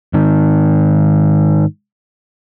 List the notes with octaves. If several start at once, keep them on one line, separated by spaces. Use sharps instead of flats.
G#2 D#3